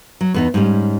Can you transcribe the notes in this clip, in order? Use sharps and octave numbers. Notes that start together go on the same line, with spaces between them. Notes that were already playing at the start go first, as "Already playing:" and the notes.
F#3
E2 B3 D#4
G#2 G3 C#4